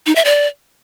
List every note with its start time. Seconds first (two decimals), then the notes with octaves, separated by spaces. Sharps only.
0.06 D#4
0.16 E5
0.25 D5